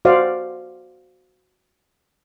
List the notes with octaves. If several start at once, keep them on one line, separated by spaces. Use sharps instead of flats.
F#4 C5 D5 F5